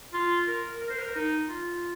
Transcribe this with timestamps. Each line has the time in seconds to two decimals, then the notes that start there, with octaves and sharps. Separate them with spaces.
0.14 F4
0.47 A#4
0.80 A#4
0.90 C5
0.99 A#4
1.15 D#4
1.48 F4